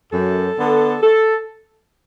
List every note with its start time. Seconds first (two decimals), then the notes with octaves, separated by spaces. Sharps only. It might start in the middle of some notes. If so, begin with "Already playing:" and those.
0.12 F#2 A4
0.58 D3 B3
1.03 A4